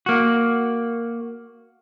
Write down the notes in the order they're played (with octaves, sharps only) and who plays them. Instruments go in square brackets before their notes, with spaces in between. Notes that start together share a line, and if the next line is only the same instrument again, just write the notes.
[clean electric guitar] A#3 F#4